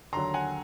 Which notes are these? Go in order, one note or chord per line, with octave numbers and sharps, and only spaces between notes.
D#2 D3 F#3 A#5 C6
F#5 G#5